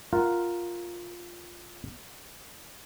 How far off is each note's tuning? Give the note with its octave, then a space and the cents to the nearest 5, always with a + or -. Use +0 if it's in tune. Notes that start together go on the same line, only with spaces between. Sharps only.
F4 +0 A#4 +0 F#5 +0